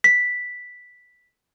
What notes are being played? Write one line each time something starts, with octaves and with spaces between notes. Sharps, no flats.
B6